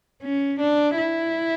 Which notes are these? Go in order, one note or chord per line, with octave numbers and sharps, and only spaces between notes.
C#4
D4
E4